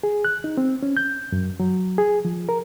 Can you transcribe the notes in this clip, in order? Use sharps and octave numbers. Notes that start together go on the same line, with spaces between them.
G#4
F#6
D#4
C4
C#4
G6
F#2
F#3
G#4
F3
A#4